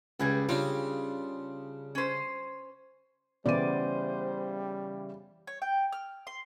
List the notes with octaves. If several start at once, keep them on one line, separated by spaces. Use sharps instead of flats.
C#2 G3 G#4 B4
C#3 G3 C4 D4 F4
C#4 C5
C#3 E3 G3 B3 C5 D5 D#7
C#5
G5
F6
C6